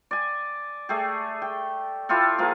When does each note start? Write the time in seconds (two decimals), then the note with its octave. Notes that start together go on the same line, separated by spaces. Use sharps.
0.11 D5 G#5
0.89 A3 G4 G#4
1.42 G5
2.09 E4 F4 G4 A4
2.38 F3 A#3 F4 G#4